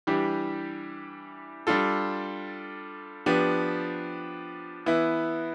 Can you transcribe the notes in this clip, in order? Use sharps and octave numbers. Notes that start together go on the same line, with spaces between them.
E3 G3 D4 G4
G3 D4 F4 A4
F3 B3 D4 G4
E3 B3 E4